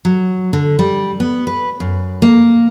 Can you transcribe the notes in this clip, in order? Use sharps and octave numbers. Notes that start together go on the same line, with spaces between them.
F#3
D3
G3
B3
B4
F#2
A#3